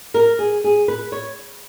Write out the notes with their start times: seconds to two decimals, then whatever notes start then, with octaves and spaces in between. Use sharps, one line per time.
0.14 A#4
0.39 G#4
0.64 G#4
0.88 B4
1.12 C#5